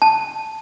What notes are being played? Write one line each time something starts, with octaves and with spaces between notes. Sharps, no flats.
A5